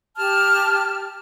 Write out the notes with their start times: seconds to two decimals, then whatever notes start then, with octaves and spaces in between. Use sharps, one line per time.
0.17 G4 A5 F6